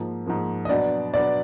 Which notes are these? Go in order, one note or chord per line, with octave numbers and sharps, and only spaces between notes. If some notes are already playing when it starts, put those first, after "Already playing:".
Already playing: G#2 F3 A#3
G#2 F3 A#3
D#5
B2 F#3 B3 D4 D5
B2 F#3 B3 D4 D5